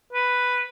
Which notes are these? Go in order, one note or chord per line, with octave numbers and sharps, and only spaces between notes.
B4